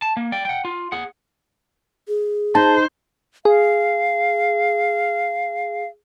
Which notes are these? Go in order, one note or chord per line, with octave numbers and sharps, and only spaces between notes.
A5
A#3
D5 G5
F#5 G5
F4
G#4 F#5
G#4
D#4 C5 A5
G#4 F5